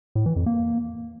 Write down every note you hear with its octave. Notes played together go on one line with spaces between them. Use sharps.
A2
E3
F2
A#3